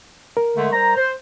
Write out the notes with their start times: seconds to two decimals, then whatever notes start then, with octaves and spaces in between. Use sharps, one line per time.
0.37 A#4
0.56 D3 G#3 A3
0.73 G3 C5 A#5
0.96 C5